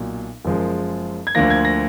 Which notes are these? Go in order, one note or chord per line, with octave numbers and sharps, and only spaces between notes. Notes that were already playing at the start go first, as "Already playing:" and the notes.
Already playing: B1 A#2 F#3
F#1 F#2 F3 G#3
G#6
D2 D3 F3 A#3 A#6
G#6
A#6